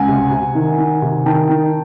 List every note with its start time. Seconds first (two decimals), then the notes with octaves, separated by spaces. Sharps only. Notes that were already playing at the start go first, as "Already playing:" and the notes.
Already playing: C#2 F#5 G#5
0.08 C3
0.31 C3
0.55 D#3
0.78 D#3
1.02 C3
1.26 D#3 G5 A5
1.49 D#3